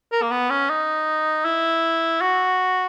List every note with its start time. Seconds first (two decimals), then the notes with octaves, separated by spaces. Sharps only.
0.12 A#4
0.22 A#3
0.31 B3
0.50 C#4
0.70 D#4
1.45 E4
2.21 F#4